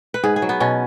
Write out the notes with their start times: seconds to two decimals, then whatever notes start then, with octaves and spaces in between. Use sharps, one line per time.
0.14 B4
0.24 G#2 G#4
0.36 G#4
0.42 F#3
0.49 B3
0.60 B2 C#4